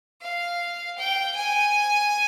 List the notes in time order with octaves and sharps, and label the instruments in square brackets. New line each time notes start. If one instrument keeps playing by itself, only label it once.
[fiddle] F5
G5
G#5